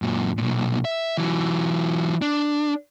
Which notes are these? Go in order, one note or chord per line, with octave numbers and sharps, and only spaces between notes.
F#2 A#2
B1 A#2
E5
E3 F#3
D4